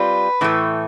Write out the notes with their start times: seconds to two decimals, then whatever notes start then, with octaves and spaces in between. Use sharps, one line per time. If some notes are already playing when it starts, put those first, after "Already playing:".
Already playing: G3 C4 F4 B4
0.41 A2 E3 A3